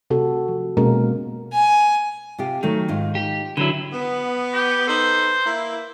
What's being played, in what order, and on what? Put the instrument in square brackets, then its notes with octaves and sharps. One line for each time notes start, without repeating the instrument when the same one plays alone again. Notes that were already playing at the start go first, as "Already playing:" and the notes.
[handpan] C3 F#4 A4
F3
B2 G#3 A#3 C#4 A#4
[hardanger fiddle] G#5
[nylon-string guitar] C3 F4 G4
[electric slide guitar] D#3 [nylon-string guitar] F#3 A3
[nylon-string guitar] G#2 D#4 F4
[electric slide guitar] G4
[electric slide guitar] D3 F#3 E4 [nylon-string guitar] B4
[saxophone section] B3
[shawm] G4
[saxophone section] D#4 A4 B4 [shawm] C5
[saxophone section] A#3 E4